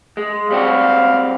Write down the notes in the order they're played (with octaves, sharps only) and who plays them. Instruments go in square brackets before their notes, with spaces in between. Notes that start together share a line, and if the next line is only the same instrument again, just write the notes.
[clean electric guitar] G#3
[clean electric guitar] G3 C4 F#4 [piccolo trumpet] F5